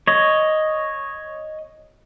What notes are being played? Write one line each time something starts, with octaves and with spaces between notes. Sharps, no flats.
C#5 D#5